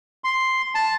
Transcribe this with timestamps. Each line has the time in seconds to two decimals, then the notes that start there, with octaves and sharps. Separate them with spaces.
0.24 C6
0.75 A5